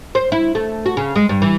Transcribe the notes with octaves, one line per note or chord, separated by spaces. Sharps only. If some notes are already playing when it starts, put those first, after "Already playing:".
C5
E4
A3
F#4
C#3
G#3
G2
E3